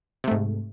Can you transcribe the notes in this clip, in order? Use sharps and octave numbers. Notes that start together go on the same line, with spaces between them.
G#2 C3 A3